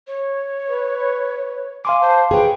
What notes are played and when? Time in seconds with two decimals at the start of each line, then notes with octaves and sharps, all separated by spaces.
0.07 C#5
0.68 B4
1.85 F5 G#5 C6 D6
2.01 C5 A5
2.31 G#4 B4 C#5 G5